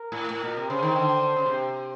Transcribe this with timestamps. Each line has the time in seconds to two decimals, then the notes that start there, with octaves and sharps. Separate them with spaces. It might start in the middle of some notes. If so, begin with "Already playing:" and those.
Already playing: A#4
0.12 A2
0.30 A2 A#4
0.44 A#2
0.57 C3
0.69 C#3 C5
0.83 D#3
0.95 D3
1.36 C#3
1.46 C3